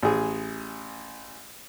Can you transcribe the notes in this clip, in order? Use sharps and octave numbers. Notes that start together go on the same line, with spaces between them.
A1 G#4